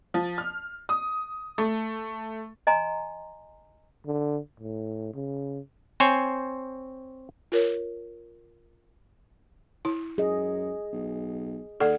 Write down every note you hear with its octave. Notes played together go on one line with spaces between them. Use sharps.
F3
F6
D#6
A3
D#5 G#5 A#5 C6
D3
A2
C#3
C4 C5 C#5 G#5
F4 A#4 C#5
E4
F#2 G#4 D#5
B1
D#2 A4 D5 F#5